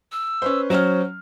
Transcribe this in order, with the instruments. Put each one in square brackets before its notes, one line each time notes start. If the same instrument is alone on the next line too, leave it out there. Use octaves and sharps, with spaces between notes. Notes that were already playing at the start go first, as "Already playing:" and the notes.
[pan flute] E6
[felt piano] C#4 B4 C5
[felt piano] F#3 C#4 F6 [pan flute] C5